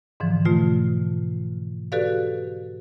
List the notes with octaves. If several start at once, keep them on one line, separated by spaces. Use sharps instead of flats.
G#2 D3 E3 F3
B2 A3 F4
F#4 G4 A4 B4 D5 F5